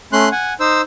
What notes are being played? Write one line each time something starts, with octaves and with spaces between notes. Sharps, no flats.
A3 C#4 C6 F#6
F#5 G#5
D#4 C5 E6